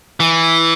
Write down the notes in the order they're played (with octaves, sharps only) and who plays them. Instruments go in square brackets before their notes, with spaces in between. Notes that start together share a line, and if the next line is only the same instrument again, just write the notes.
[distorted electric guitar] E3